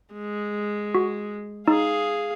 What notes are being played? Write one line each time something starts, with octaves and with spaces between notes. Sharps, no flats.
G#3
F#4
D#4 G#4 F5